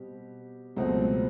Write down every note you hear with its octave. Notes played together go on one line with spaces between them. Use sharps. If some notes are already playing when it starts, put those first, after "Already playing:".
Already playing: B2 G3 C4 G4
C#2 B2 F#3 A3 C4